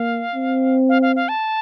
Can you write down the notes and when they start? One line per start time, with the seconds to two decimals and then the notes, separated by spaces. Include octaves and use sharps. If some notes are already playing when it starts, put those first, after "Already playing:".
Already playing: A#3 F5
0.36 C4
0.89 F5
1.02 F5
1.16 F5
1.29 A5